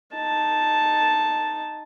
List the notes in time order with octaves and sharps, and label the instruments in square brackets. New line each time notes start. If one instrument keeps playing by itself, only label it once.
[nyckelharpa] D#4 A5